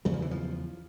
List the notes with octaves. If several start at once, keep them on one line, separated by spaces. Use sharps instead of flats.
E2 C#3 G3
F3
E3
F3